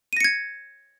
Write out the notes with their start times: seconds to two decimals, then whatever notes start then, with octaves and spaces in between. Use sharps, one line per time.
0.13 D#7
0.17 A#6
0.21 C#7
0.24 G#6